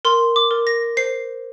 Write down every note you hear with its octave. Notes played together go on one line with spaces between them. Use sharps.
A#4 C6
D6
A#4
A#6
C5 C7